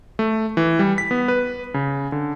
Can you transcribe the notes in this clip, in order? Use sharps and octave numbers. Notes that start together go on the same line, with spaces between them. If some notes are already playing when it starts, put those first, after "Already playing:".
A3
E3
G3
B6
B3
B4
C#3
D3